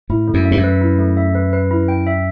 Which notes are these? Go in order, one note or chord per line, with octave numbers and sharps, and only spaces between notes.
A2 E4
A3
F#2
E5
G2
F#2
B4
E4
A3
E5
B4
B4
E4
G5
E5